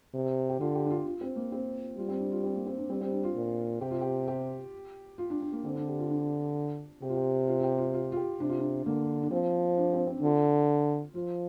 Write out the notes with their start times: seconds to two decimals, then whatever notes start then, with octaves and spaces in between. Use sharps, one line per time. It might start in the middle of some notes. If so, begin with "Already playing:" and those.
0.14 C3
0.49 G4
0.60 D3 F4
0.75 G4
0.86 D4
0.90 F4
1.06 F4
1.21 C4
1.36 A#3
1.52 C4
1.97 G3 F4
2.09 C4
2.20 D4
2.32 F4
2.44 C4
2.56 A#3
2.67 C4
2.78 D4
2.90 G3 C4
3.01 C4
3.12 D4
3.24 F4
3.36 A#2
3.81 C3 G4
3.91 F4
4.01 G4
4.28 G4
5.18 F4
5.30 D4
5.41 D4
5.52 A#3
5.65 D3 C4
5.76 D4
5.88 G4
5.99 F4
6.11 D4
7.02 C3 G4
7.09 F4
7.16 G4
7.48 F4
7.59 F4
7.64 G4
7.78 F4
7.93 F4
8.12 F4
8.17 G4
8.40 C3 D4
8.49 F4
8.59 D4
8.85 D3 A#3
9.23 D4
9.31 F3 C4
9.77 D4
9.93 C4
10.07 C4
10.18 D4
10.22 D3 F4
11.15 F3 F4